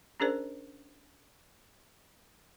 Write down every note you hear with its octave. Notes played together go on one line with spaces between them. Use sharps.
C#4 D4 G#4 A#4 C5 D5